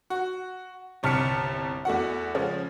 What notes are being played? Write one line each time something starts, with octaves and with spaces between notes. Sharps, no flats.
F#4
G1 C2 A5 F6 B6 C#7
E2 A3 F#4 F#5
C#3 F3 G#3 C#4